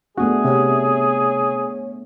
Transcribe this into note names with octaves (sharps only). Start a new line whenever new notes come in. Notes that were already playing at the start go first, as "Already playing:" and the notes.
A3 B3 D4 F#4 G#4
C3 C#5